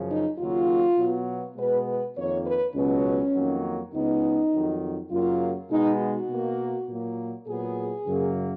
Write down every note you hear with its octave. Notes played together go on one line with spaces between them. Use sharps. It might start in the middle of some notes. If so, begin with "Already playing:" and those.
Already playing: F#2 C#3 F3
D#4
D#2 C#3 F#3 A#3 F4
B2 F#3 B3
B2 G#3 B3 B4
B4
F2 D#3 A#3 C#5
B4
C#2 B2 F#3 B3 C#4
F2 D#3 F#3 A#3
C#2 C#3 G#3 B3 D#4
F2 D#3 F#3
F#2 C#3 F#3 A#3 F4
B2 G#3 B3 D#4
F#4
B2 A#3
A#2 F#3 A#3
A#2 F#3 B3 G#4
F#2 C#3 F#3 A#3